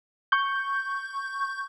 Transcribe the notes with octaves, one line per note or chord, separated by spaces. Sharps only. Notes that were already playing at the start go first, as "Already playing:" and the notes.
C#6 G6